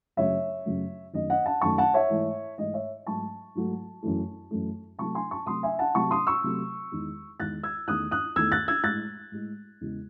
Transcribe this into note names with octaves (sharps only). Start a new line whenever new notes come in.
F#2 C#3 F#3 A3 C#5 E5
F#2 C#3 F#3 A3
F#2 D#3 A3 D#5
D#5 F#5
F#5 A5
F#2 D#3 A3 A5 C#6
F#5 A5
C#5 E5
G#2 E3 A3
G#2 E3 A3 D#5
C#5 E5
G#2 F#3 A3 A5 C#6
G#2 F#3 A3
F#2 E3 A3
F#2 E3 A3
C3 F#3 A3 A5 C#6
G#5 C6
A5 C#6
C3 F#3 A3 C6 D#6
E5 G#5
F#5 A5
C3 F#3 A3 A5 C#6
C6 D#6
C#6 E6
C3 F#3 A3
E2 D#3 G#3
E2 D#3 G#3 F#6 A6
E6 G#6
E2 D#3 A3 D#6 F#6
D#6 F#6
E2 D#3 A3 E6 G#6
F#6 A6
E6 G#6
A2 G#3 F#6 A6
A2 G#3
E2 C#3 G#3